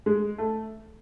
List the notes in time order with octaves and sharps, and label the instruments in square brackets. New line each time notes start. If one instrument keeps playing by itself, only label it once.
[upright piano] G#3
A3